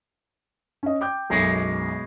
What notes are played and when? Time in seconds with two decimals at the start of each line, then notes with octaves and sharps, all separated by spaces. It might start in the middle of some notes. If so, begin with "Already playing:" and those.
0.83 C#4 D#5
1.01 G5 D6 G6
1.30 B1 F#2 B2 G#3